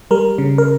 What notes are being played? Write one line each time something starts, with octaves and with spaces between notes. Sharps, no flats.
G3 A#4
C#3
A#4